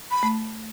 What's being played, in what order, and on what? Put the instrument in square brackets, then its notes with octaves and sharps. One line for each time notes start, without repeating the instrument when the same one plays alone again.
[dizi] B5
[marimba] A3